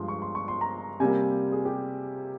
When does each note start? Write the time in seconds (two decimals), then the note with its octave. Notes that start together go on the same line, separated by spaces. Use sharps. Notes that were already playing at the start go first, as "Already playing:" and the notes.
Already playing: G2 F3 G#3 C6
0.08 C#6
0.22 C6
0.35 C#6
0.48 C6
0.61 A#5
1.00 C3 G3 A#3 G#5
1.52 G#4
1.65 G4